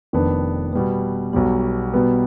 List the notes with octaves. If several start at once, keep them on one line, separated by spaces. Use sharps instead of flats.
F1 F2 D#3 B3 D4
B2 G3 B3
B1 B2 G3
B2 G3 B3